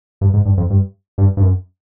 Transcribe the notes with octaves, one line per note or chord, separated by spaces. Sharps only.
G2
G#2
G2
F2
G2
G2
G2
F#2